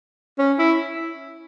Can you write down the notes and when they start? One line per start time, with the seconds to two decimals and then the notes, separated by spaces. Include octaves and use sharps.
0.39 C#4
0.59 E4